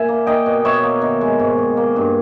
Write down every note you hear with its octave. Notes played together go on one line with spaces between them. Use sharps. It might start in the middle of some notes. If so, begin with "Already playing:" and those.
Already playing: A#2 E5 G#5
A#3
A#3 D#5 G5
B2
B2 C#5 E5
A#3
D#3
G#3
G#2
G#2
A#3
G2